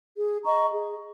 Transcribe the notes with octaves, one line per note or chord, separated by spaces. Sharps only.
G#4
D#5 A#5 C#6
G#4